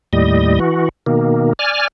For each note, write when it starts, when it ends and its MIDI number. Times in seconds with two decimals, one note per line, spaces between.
0.13 0.59 39
0.13 0.59 45
0.13 0.59 55
0.13 0.59 75
0.60 0.89 52
0.60 0.89 66
1.06 1.53 47
1.06 1.53 51
1.06 1.53 58
1.59 1.88 74
1.59 1.88 80
1.59 1.88 89